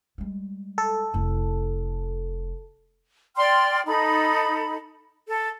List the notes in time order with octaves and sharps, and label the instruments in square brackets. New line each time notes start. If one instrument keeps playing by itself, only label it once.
[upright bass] G3 G#3
[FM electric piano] A4
[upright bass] F1 E4
[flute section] D5 G5 C6 F6
D#4 A4 B5
A4